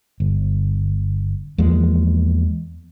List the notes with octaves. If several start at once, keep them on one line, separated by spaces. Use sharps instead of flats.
G1
E2 F3 G#3 A#3